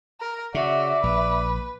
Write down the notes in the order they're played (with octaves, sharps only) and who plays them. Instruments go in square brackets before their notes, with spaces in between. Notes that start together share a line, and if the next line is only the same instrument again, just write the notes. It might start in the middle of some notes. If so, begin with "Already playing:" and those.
[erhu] A#4
[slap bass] C#3 [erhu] F#4 [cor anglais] D5 [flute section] E5
[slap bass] A#1 [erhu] B4